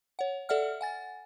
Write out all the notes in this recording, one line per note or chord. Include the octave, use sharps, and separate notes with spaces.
C#5 F#5
A4 D5 E5 F#5 F6
F#5 G#5 A6